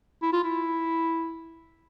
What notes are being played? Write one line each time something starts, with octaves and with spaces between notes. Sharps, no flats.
E4
F4
E4